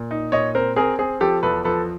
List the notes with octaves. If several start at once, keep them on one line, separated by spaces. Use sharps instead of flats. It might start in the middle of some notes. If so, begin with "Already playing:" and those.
Already playing: A#2
D#4
A#2 C#5 D#5
C4 A#4 C5
C4 G#4 A#4
C4 G#4
F3 G4 A4
E2 A4 B4
F3 A4 B4